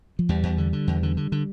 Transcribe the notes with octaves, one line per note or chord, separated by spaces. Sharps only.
F3
E2 G3
E2
D3
D3
E2
D3
D3
D3